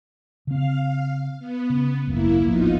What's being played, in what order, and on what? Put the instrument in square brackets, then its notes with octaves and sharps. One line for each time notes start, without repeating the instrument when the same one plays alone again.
[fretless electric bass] C#3 C4 [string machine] F5
[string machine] B3
[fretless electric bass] C#3
[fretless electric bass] G#1 C#2 F#2 [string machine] A#3 E4
[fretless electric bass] D1 G#1 F3 [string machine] B3 D#4 F4